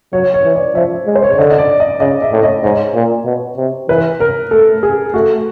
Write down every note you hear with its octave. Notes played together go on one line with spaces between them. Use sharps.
F#3 C#5
C#5
E3
D5
F3 E5
G#3
C5
C#5
D5
D3 D#5
D#5
D5
D#5
C#3 D#5
E5
A2
D#5
G#2 C#5
A#2
B2
C3
E3 B4
A#4
A3 A4
G#4
A3 F#4